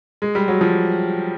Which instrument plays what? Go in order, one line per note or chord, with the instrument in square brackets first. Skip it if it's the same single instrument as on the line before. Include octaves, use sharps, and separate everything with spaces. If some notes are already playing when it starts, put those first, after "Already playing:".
[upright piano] G#3
G3
F#3
F3